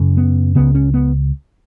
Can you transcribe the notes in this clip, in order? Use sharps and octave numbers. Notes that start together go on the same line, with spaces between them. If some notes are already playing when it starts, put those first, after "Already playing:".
Already playing: F#2 C#3
B3
C#2 C#3 B3
C#4
B3